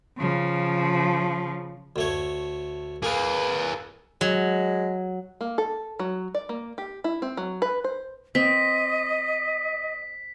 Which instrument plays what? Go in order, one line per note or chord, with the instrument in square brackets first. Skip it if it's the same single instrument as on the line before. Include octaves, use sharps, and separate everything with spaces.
[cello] C#3 F3
[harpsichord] D2 A3 C#5
[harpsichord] A#3 A#4 [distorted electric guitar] G#4 B4
[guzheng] F#3 [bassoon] G#3
[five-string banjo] A#3
A4
F#3
D5
A#3
G4
E4
C4
F#3
B4
C5
[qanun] C4 [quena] D#5 [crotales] B6